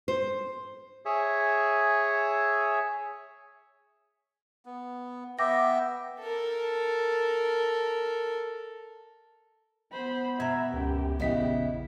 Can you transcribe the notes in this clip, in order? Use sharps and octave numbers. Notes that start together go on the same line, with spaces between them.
C5
G#4 C#5 E5
B3
B3 E5 G5 D6 A#6
A4 A#4
B3 C5 B5
B2 E5 A#5 G#6
C#2 F#2 G4
A#1 E2 C#3 B3 E4 D#5 B6